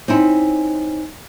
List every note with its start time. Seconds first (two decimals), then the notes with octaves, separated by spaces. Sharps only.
0.08 C4 C#4 D#4 E4